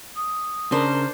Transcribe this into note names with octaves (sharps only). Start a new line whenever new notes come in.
D#6
C#3 D4 A#4 C5